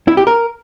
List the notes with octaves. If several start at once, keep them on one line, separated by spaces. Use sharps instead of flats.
E4
G4
A#4